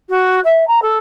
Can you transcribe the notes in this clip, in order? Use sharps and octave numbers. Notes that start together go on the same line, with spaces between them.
F#4
E5
A#5
A4